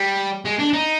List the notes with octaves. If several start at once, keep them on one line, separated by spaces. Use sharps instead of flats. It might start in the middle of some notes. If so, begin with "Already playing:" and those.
Already playing: G3
G#3
D4
D#4